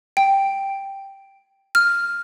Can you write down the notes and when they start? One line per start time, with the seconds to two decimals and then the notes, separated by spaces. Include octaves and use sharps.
0.17 G5
1.75 F6